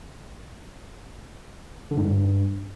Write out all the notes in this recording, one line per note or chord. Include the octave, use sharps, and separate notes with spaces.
D3
G#2
G2